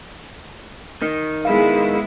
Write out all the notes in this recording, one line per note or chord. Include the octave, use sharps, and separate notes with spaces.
D#3
G#3 B3 E4 G#4 F5